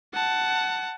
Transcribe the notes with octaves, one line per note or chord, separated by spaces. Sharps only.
F#5 A5